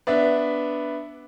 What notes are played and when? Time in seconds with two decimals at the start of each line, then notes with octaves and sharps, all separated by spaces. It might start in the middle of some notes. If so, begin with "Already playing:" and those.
0.07 B3 D4 E5